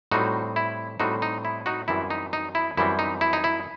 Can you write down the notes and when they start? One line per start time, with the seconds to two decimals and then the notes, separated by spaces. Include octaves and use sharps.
0.11 A2 G3 C4 D#4 F#4
0.56 E4
1.00 A2 G3 C4 D#4 F#4
1.22 D#4
1.45 E4
1.66 D#4 F#4
1.88 F#2 E3 G3 C4 E4
2.10 D#4
2.33 D#4
2.55 E4
2.77 F#2 E3 G3 C4 E4
2.99 D#4
3.21 E4
3.33 D#4
3.44 E4